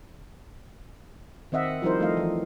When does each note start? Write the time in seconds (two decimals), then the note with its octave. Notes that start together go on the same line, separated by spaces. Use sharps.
1.52 D#3 C4 D#5 E5 F#5
1.82 F3 G3 D#4 E4 A#4 C5
2.00 F3 A3 D#4 D#5 F5
2.17 E3 F3